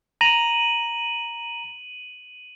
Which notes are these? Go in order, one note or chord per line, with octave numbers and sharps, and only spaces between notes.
A#5 D#7 F#7